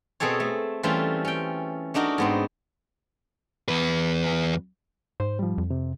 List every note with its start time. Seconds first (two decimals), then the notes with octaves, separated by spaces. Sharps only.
0.20 B2 C4 G#4 A4 C#5
0.40 A3
0.83 E3 G3 A3 C4 C#4 F4
1.25 C#4 G5
1.94 A3 D4 D#4 F#4 A#4
2.18 G#2 B3 C4
3.68 E2 B4
5.20 G#2 C5
5.39 F3 G3
5.58 F2
5.70 C3